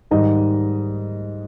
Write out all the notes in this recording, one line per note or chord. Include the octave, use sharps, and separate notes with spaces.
G#2 D#3 G3 D#5